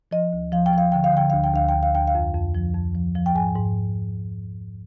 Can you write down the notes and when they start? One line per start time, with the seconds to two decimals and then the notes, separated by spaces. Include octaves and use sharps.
0.11 F3 D#5
0.33 D2
0.52 F3 F5
0.66 G5
0.73 F3 F5
0.92 D3 G5
1.04 F5
1.13 D3 G5
1.30 D2 F5
1.44 G5
1.53 D2 F5
1.69 G5
1.74 D2
1.83 F5
1.94 D2 G5
2.07 F5
2.15 F2
2.35 F2
2.55 F3
2.74 F2
2.95 F3
3.16 F3
3.26 G5
3.35 G#2 G#5
3.55 G#2